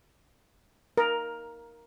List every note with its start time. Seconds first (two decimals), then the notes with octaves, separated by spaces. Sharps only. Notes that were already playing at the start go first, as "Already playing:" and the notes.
0.97 A#4